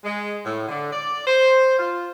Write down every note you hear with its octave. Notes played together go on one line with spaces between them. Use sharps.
G#3
A2
D3
D5
C5
F4